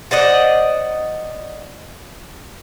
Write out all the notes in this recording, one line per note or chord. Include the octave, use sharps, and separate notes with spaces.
C5 D5 D#5 F#5